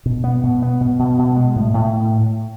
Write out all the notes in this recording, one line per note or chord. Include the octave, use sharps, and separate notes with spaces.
B2
B3
B2
B3
B2
B2
B2
G#3
A2
A2